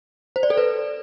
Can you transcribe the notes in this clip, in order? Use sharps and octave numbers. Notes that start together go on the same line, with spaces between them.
C5
D5
A4
B4